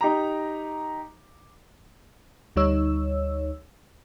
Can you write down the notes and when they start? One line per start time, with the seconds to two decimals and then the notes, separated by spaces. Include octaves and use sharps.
0.01 D#4 G4 A#5
2.56 D2 G3 D#4 C#5 E6